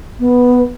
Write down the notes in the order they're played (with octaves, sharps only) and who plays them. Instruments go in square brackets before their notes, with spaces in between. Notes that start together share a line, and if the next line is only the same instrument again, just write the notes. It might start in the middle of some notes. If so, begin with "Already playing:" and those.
[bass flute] B3